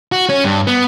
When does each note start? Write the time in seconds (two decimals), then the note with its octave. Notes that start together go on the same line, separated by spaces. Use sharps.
0.12 F#4
0.29 C#4
0.44 G2
0.67 B3